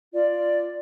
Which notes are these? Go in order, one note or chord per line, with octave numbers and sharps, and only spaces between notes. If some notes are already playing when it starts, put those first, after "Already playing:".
F4 D5